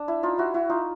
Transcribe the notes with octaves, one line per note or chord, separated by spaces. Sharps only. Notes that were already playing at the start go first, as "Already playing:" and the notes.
Already playing: D4
E4
D#4 F4
E4 F#4
E4 F#4
D#4 F4